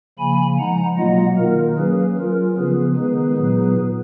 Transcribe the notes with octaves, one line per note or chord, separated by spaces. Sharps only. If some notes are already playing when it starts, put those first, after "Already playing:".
C#3 F3 A#3 G#5 B5
F3 G#3 D#4 F#5 A#5
B2 F#3 A#3 F4 D#5 F#5
D#3 A#3 D#4 A#4
F#3 A#3 C#4 G#4 B4
F#3 C#4 F4 A#4
C#3 F3 B3 G#4 B4
D#3 G#3 B3 D#4 G#4 B4
A#2 F#3 B3 D#4